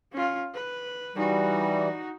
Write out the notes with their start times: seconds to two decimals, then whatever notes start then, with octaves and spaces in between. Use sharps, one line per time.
0.13 C#4 F4
0.54 B4
1.16 E3 G3 D#4 F#4